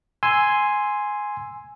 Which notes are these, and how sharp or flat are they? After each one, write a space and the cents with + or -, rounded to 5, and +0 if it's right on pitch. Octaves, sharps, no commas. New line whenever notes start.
G#5 +0 C6 +0 E6 +0